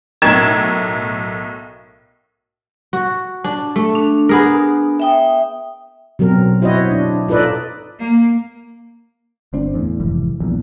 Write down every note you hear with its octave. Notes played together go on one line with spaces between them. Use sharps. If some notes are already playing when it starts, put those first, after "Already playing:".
B1 A2 A#4 G#6 E7
F#4
D4
A3
D4
B3 G#4 A#4
E5 G5 D#6
B2 F#3 C4 A#4
E4 F#4 C5 C#5 D#5
D4
D#4 F4 A4 B4 D5 D#5
A#3
G1 C4 D4
E2 A2
F1 G#2 E3
D#1 A#1 E2